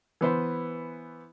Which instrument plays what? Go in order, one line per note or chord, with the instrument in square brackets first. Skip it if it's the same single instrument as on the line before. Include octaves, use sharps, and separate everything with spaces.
[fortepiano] E3 B3 C5